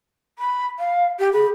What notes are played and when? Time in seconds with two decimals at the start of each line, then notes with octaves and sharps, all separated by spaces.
0.38 B5
0.79 F5
1.19 G4
1.33 G#4 B5